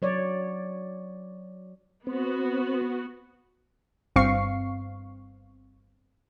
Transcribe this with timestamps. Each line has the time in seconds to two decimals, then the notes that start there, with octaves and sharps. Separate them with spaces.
0.02 F#3 C#5 D5
2.07 B3 C4 F#4
4.16 G1 G2 C4 F5 C#6 C7